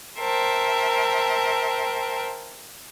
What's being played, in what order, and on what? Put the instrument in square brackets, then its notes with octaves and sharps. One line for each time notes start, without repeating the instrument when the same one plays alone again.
[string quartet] A#4 C5 E5 G5 A5